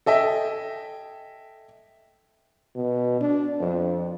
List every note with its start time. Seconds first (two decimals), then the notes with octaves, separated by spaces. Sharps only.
0.06 A4 D#5 E5 G5 G#5
2.76 B2
3.21 D4
3.60 F2